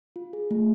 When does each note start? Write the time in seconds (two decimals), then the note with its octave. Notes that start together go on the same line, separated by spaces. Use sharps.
0.16 F4
0.33 G#4
0.51 A3